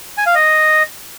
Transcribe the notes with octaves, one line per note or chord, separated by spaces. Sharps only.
G#5
F5
D#5